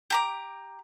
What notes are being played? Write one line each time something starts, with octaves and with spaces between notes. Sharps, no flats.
G4 A#5 D6